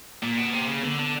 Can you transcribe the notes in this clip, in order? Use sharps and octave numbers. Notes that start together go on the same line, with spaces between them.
A#2 A#3
B2
C3
C#3
D3 B3
D3